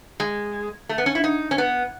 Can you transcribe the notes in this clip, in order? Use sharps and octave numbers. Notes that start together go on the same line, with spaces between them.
G#3
A3
B3
C#4
E4
D#4
C#4
B3